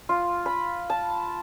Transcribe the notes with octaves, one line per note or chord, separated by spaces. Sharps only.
F4
B5
A5